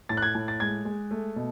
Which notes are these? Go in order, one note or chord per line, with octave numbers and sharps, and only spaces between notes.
A2 A6
F#6
G#6
A2
A6
G#3 G#6
G#3
A3
B2